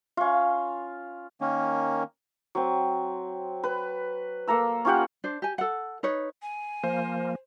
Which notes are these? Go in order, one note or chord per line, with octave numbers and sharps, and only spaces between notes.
C#4 F4 F5
D#3 A#3 C#4
F#3 C4
B4
A#3 A4 A#5 E6
C#4 F4 G4 F#5
D4 C5
G4 G#5
A4 F#5
D#4 B4 C#5
G#5
F3 A#3 C5